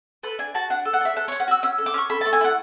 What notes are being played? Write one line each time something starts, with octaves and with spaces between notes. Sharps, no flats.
A4 B4
D4 G#5
F#4 A5
D4 F#5
A4
F#5
D4 E5
A4 F#5
C#5
C#4
F#5
F#4 E6
C#4 E6
A4
D6
C#4 C#6
A4 B5
A5
A3
G#5
E4 F#5